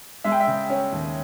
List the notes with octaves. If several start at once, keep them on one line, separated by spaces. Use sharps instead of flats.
G#3 E5
G5
E5
C#3
C#4
D#2